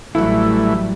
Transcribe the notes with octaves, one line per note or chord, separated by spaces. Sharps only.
A1 E3 F#3 G3 A3 E4